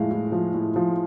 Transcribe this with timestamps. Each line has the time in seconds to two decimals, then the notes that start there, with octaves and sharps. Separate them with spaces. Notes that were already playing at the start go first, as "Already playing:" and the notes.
Already playing: A2 F3 G#3 F5
0.11 A2
0.32 F3
0.54 A2
0.76 F3